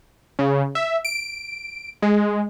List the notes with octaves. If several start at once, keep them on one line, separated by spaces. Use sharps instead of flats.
C#3
E5
D7
G#3